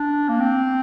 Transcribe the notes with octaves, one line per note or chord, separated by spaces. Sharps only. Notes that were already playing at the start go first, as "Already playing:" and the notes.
Already playing: D4
A#3
C4